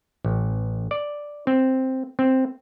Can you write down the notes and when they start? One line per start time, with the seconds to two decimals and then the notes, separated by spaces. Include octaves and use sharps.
0.25 A1
0.91 D5
1.47 C4
2.19 C4